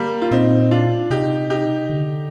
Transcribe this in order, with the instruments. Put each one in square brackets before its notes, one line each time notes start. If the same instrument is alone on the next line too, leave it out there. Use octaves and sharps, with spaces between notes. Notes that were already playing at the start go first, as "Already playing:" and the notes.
Already playing: [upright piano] G3 A#3
F4
[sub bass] A#2 [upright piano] C4 D#4
[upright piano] D4 F4
[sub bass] C3 [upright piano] D#4 G4
[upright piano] D#4 G4
[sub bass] D3